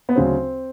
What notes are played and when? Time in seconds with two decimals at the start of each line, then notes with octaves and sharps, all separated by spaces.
0.09 B3
0.15 D2 C#3 F#3 C4